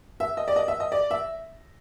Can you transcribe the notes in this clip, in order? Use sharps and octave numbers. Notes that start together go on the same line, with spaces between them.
E5
D#5
D5
D#5
E5
D#5
D5
E5